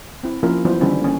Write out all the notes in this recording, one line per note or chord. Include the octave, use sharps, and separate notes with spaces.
C4 E4
F3 A#3 C#4 E4 F4 A#4
E3 F#3 B3 E4 F4 C5
D3 D#3 G3 C#4 E4 C5
A#3 C#4